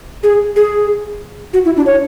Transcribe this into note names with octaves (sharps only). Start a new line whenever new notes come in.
G#4
G#4
F#4
E4
D4
C#5